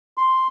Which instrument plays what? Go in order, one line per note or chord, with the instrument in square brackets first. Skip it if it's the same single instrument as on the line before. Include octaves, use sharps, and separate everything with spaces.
[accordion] C6